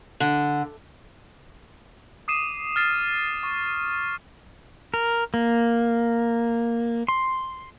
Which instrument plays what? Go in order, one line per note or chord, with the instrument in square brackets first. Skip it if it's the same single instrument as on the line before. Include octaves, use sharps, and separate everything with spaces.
[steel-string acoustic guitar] D3
[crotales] D6 D#6 C7 D#7 E7
F6 A6 C7 E7
C#6
[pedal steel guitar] A#4
A#3
C6